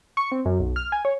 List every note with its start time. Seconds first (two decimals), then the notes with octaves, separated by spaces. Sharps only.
0.17 C#6
0.32 C4
0.45 F#2
0.60 B1
0.76 F6
0.92 G#5
1.05 C#5